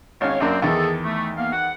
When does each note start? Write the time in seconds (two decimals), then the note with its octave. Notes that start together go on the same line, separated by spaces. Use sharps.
0.21 G#1 C#4 C#5 F5
0.40 F#2 A#3 C4 D4 A#4
0.62 E2 D#3 G#4 A4
1.04 A3
1.37 A#3 B3 F5
1.53 F#5